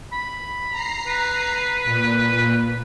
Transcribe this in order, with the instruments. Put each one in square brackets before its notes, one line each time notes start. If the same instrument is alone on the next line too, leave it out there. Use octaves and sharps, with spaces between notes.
[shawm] B5
[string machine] A#5 C7
[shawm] B4
[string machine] A#2